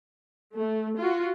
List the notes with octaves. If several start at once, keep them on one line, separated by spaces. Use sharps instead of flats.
A3
F4 F#4